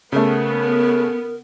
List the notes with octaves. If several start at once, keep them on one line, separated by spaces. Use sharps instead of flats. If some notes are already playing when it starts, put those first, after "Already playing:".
C#3 A3 B3 A#4